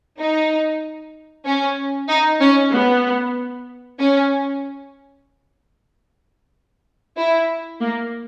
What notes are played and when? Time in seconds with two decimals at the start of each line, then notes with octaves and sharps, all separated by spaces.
0.19 D#4
1.46 C#4
2.09 D#4
2.41 C#4
2.72 B3
4.00 C#4
7.17 E4
7.80 A#3